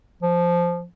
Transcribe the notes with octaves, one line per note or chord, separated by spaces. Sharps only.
F3